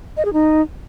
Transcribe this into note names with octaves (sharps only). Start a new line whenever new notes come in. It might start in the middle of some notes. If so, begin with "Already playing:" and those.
D#5
G#4
D#4